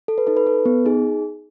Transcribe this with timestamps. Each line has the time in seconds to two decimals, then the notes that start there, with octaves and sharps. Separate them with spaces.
0.08 A4
0.18 B4
0.27 D#4 A4
0.37 B4
0.47 A4
0.65 B3
0.85 D#4 G#4